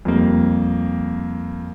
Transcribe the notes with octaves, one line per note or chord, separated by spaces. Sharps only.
F2 G3 A#3